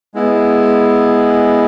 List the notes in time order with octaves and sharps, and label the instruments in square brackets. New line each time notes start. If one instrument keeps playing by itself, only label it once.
[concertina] G#3 B3 E4